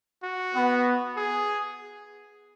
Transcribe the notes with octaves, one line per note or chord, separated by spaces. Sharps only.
F#4
B3
G#4